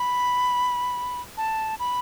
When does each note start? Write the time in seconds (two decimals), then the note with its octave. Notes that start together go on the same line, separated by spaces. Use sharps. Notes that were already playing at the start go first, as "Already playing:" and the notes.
Already playing: B5
1.37 A5
1.79 B5